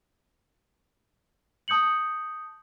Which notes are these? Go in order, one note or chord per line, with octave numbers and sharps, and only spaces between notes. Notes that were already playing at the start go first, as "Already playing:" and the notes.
A5 D#6 G6 C#7 F#7